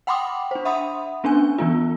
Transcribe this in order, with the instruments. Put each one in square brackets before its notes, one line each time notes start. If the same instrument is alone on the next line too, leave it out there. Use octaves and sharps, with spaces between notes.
[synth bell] F#5 G5 B5 C6 D6 D#6
D4 C5
E5 F#5 B5 C6 D#6
B3 C#4 D4 G#5
E3 B3 F4